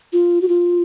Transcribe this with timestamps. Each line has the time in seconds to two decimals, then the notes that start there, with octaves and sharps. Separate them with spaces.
0.13 F4
0.42 F#4
0.48 F4